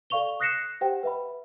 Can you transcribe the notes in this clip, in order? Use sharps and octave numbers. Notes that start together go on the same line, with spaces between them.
A4 D5 F5 C#6 F7 G7
D#6 F#6 A#6 C7 C#7 E7
G4 C5 F#5 G5
B4 E5 B5